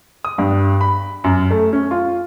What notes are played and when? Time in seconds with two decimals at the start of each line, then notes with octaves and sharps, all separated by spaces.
0.25 D#6
0.38 G2
0.81 B5
1.24 F#2
1.51 A3
1.73 C#4
1.91 F4